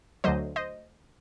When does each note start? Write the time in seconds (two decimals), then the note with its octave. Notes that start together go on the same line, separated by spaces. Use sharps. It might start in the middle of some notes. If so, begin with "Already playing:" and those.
0.24 D2 D3 F#3 C5 D#5
0.56 C5 D#5